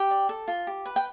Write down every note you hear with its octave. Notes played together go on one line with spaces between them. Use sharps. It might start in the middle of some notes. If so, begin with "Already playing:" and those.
Already playing: G4 G5
D5
A4
F4
G4
B4
G5